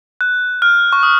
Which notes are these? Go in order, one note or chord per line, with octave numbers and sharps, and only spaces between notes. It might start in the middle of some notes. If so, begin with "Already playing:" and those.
F#6
F6
C#6
D#6